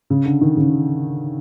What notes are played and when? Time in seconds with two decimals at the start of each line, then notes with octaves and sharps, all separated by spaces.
0.10 C#3
0.26 D3
0.41 D#3
0.57 C#3